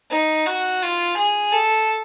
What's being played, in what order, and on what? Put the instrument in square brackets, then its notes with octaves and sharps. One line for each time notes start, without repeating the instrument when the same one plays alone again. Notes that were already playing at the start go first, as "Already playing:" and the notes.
[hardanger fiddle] D#4
F#4
F4
G#4
A4